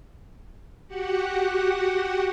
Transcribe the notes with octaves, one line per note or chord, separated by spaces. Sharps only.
F#4 G4 F#5